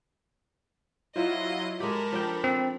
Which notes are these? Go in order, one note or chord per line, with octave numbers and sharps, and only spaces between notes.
F#3 E4 F4 C5 D#5
G#3 G4 A4 A#4 B5
F3 D4 G5
C4